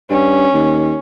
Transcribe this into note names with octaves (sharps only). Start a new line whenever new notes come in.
G2 C#4
D#2